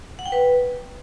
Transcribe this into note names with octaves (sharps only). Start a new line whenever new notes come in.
F#5
G5
B4